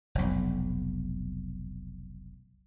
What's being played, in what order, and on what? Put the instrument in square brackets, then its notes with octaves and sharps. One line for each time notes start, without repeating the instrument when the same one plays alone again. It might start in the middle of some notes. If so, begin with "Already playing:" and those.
[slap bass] F1 B1